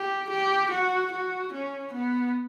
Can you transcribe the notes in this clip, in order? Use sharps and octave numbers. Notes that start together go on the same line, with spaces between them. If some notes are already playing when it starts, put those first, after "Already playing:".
Already playing: G4
G4
F#4
F#4
C#4
B3